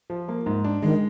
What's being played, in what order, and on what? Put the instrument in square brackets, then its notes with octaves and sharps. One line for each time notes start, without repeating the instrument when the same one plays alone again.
[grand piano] F3
A#3
G#2
D4
[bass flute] D#3 [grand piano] G#3